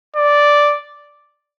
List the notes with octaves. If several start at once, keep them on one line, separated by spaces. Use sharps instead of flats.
D5